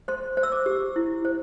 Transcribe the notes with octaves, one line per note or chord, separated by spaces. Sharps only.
C5 C6
C5
E6
D6
G4
E4
C5